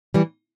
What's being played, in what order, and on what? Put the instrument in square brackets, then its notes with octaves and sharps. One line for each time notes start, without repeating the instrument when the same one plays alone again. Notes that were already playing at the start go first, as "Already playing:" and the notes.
[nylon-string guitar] E3 G3